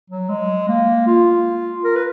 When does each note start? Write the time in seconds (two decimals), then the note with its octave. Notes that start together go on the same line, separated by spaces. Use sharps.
0.10 F#3
0.29 G#3
0.68 A#3
1.07 F4
1.84 A#4
1.96 B4